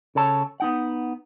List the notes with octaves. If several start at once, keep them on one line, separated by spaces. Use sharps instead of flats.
C#3 A4 C#5 A5
B3 D#4 F#5